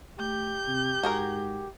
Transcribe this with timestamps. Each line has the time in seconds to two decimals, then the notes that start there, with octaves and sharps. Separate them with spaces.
0.19 A3 G4 G6
0.68 C3
1.03 G#2 F#4 G#4 A#4